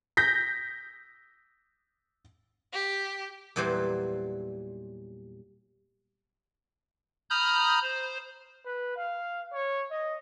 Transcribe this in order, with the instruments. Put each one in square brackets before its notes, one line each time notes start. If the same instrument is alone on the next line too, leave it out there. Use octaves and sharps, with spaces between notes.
[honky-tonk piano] G6 A#6 B6
[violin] G4
[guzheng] E2 A#2 E3 F#3 G3 C5
[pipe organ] A#5 B5 D#6 F6 G6
C5
[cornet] B4
F5
C#5
D#5